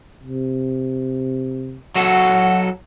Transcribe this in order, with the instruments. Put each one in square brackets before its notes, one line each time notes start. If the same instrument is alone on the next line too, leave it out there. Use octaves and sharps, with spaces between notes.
[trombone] C3
[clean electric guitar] F#3 F#4 A4 [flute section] F#5